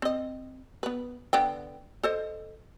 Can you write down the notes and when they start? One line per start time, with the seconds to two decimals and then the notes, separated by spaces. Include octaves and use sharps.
0.02 C4 D#5
0.83 B3 B4
1.33 D3 B3 G5
2.03 A4 C5 D#5